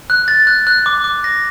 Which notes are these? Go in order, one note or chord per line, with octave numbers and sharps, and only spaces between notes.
F#6
A6
F#6
F#6
D6
D6
A#6